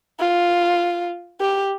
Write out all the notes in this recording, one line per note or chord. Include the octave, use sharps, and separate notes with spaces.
F4
G4